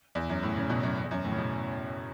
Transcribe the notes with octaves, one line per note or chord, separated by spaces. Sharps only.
E2
F#2
A2
C#3
B2
F#2
E2
F#2
A2
C#3
B2